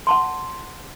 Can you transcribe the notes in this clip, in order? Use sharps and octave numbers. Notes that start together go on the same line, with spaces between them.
F#5 A5 C6